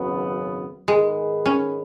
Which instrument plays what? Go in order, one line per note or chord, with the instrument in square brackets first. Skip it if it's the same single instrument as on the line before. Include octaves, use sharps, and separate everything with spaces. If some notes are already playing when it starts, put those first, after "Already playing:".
Already playing: [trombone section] G#1 F#2 C#3 B3 [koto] F#3
[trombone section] G#2 D#3 B3 G#4 B4 [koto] G#3
[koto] C#4